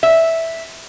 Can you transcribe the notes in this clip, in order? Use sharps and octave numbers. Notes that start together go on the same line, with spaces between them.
E5